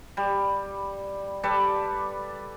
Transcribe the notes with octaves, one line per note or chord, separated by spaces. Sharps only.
G3
G3 A4 B4 D5